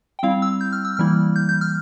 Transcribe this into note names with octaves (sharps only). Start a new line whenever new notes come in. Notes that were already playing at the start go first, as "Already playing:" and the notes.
G5
G3 C4 E4 F5
E6
G6
F6
E6
E3 G3 A#3 E4 F6
G6
G6
F6